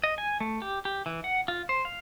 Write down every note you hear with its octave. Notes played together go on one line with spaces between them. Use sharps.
D#5
G#5
A3
G4
G4
E3
F#5
F4
C5
F5